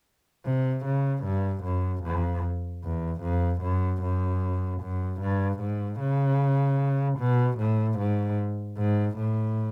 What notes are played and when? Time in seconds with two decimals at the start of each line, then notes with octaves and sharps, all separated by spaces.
0.45 C3
0.85 C#3
1.24 G2
1.64 F#2
2.04 F2
2.83 E2
3.22 F2
3.62 F#2
4.02 F#2
4.81 F#2
5.21 G2
5.61 G#2
6.00 C#3
7.18 B2
7.59 A2
7.99 G#2
8.77 G#2
9.17 A2